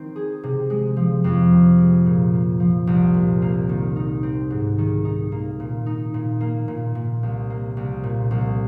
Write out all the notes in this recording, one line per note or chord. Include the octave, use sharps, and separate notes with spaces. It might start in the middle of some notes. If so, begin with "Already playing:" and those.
Already playing: D#3 C4 D#4
G#4
C3
G#3
F3
F2
C3
G#3
A#2
A#3
F3
C2
A#2
A#3
D#3
D#4
C4
G#2
D#3
D#4
A#3
A#2
D#4
A#2
A#3
A#2
A#2
C2
A#3
C2
A#2
C2